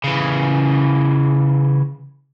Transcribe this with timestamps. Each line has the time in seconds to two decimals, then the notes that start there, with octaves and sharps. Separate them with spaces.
0.04 C#3 E3